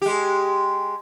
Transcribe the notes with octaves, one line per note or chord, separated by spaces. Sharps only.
G#3 G4